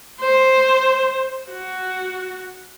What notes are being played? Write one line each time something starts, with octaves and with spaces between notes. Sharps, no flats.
C5
F#4